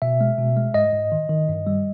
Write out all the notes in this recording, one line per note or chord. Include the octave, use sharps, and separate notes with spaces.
B2 E5
G#3
B2
G#3
G#2 D#5
G#2
D#3
D#3
G2
G3